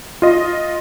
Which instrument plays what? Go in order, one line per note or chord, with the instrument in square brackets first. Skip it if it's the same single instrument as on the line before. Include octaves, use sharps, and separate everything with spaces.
[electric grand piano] F4 D#5